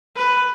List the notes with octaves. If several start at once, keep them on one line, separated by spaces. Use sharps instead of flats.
B4